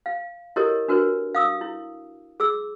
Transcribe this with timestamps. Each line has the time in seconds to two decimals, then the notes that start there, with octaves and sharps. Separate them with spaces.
0.06 F5
0.56 E4 G4 A4 A#4 C#5 D#5
0.88 D4 F#4 A#4 B4 C#5
1.35 F5 D#6 E6
1.61 E4
2.40 G#4 D6 E6